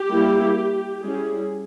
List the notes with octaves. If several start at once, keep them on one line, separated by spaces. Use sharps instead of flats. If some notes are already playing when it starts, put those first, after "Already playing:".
Already playing: G4
G3 A#3 E4
G3 C#4 E4 G#4